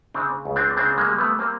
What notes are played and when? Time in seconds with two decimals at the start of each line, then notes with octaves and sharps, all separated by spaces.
0.14 C#3 C4 D4
0.45 C#2
0.56 C4 D4
0.77 C#3 C4 D4
0.97 G#3 A#3
1.08 G3
1.18 A3 B3
1.39 A#3 C4